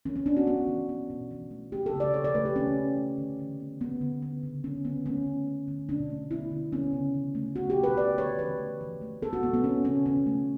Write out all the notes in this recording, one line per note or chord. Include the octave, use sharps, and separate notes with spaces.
E3 C#4
C#4
B3 D4
F#4
B3 F#4
E3
B3
B2
E3
A3
A3 G4
A4
C#3
D5
B2 C#5
D5
A3 B4
G4
E3 C#4
A3
A3
D3
E3
B3
B3
D3
B3
C#3
B3 C#4
D3 B3
A3 C#4
D3
B3
D3
B2 D4
A3
B3 E4
D3
B3 C#4
C#3
E3
A3
B3 F#4
G4
B2
B4
B3 D5
D3 C#5
E3 B4
A3
E3
A3
B3 A4
F#4
B2 B3
B3
B3 C#4
C#3 C#4
E3 C#4
A3